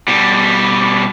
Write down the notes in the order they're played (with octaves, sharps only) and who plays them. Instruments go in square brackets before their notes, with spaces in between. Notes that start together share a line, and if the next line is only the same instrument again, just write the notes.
[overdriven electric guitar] B2 G3